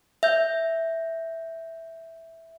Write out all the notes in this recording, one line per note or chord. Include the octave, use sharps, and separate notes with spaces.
E5 G6